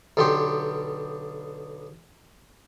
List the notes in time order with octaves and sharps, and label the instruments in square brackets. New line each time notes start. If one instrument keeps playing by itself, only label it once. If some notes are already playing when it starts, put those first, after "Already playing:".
[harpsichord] B1 D3 B3 G4 C6